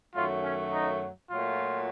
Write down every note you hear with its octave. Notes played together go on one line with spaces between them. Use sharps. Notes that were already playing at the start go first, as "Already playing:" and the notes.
F#2 D#3 F#3 A3 F4
C#4
D#4
A#2 F#3 A3 F4